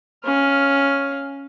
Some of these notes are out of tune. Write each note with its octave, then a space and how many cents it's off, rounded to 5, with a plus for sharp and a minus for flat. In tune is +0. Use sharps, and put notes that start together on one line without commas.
C#4 +0 F5 +0